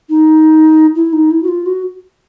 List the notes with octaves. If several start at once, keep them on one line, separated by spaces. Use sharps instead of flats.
D#4
E4
D#4
E4
F#4
F4
F#4